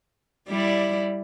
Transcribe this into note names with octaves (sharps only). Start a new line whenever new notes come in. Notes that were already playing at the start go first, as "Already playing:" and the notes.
G3 E4 D5